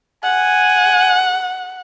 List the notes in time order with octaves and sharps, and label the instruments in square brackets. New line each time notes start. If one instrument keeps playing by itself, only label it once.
[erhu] F#5 [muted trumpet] G#5